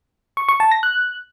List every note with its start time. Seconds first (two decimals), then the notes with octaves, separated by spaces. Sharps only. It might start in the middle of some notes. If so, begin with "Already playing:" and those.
0.37 C#6
0.49 C#6
0.60 A5
0.72 A#6
0.83 F#6